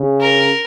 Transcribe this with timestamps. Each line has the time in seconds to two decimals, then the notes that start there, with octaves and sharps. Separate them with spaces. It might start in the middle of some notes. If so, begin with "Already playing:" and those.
Already playing: C#3
0.21 A#4